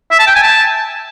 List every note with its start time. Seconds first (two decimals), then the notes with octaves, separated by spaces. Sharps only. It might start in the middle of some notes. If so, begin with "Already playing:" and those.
0.11 E5
0.19 A5
0.27 G5
0.35 G#5
0.43 A5